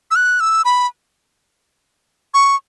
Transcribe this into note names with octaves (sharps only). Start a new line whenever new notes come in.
E6
F#6
E6
B5
C#6